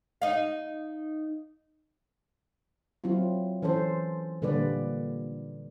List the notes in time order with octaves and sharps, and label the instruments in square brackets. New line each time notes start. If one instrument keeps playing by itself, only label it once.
[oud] D#4 F5
[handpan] F#3 C4 E4 F4
E3 C#4 A4 C5
A#2 D3 G3 A#3 B4 D5